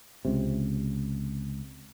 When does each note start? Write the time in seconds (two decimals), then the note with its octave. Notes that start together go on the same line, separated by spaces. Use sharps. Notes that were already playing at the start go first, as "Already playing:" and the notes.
0.25 C#2 C3